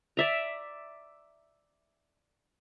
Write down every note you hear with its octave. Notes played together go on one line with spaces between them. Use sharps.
D5 E5 A#5